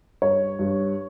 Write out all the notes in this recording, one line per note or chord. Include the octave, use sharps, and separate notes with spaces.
G2 C#5
G2